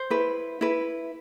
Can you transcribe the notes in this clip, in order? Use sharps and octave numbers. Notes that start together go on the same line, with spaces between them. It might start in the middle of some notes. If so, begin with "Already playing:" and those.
Already playing: C5
E4 B4
E4 B4